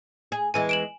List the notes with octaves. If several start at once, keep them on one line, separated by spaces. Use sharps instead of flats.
G#4
E2 E3 G#3 G#5
D7 E7 F#7